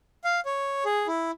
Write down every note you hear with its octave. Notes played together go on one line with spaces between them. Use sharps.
F5
C#5
G#4
E4